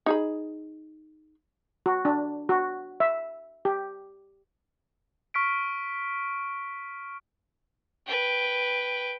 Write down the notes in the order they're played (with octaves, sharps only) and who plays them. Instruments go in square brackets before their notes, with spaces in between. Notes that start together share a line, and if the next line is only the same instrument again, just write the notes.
[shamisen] D#4 G#4 B5
[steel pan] F#4
D4
F#4
E5
G4
[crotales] C#6 F6 B6 D7
[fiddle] B4 G5